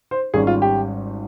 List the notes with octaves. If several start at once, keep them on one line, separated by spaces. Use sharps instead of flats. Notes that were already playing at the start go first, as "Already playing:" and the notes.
C5
G#1 G#2 G3 C#4 G#4
F4
G4